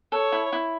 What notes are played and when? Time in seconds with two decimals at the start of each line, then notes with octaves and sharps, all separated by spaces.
0.12 A4 C#5
0.32 E4
0.52 E4